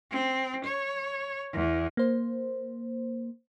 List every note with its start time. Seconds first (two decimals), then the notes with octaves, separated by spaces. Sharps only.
0.11 C4
0.65 C#5
1.53 E2
1.97 A#3 C5